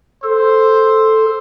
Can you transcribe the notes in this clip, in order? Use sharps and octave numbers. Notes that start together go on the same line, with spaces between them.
A4 C5